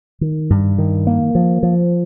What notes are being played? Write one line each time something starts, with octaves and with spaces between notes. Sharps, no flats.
D#3
G2
D#3
A#3
F3
F3